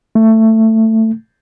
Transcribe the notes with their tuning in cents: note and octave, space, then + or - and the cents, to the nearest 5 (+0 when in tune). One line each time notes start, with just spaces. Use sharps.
A3 +15